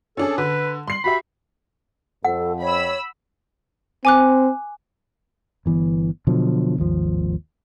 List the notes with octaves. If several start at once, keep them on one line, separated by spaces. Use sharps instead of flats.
C#4 D4 G#4 A4
D3 B4
G3 C6 C7 F#7
F#4 G4 E5 B5
F2 A4 F#5
C#5 B5 E6
C4 G#5 D6 F#6
G1 E3 B3
B2 D3 F3 F#3
G#1 D#2 F3